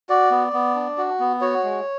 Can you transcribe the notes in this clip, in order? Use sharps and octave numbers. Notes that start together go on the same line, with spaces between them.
F#4 D5
B3
B3
D4
F#4
B3
F#4 C#5
G#3